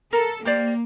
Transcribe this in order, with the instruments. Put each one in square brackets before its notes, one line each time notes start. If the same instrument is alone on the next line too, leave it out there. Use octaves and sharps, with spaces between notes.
[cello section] A4 [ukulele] A#4
[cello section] A#3 [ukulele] G4 C5 D5